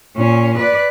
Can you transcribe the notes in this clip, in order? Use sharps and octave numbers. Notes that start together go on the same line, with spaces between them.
A#2 C#4
B4 D5